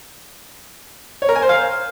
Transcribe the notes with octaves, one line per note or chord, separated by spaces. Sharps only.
C#5
A#4
G#5
C5
F5